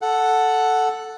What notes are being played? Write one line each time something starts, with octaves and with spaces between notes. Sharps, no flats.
A4 F#5